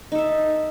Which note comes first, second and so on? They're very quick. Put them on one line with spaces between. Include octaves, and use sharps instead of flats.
D#4 A4 E5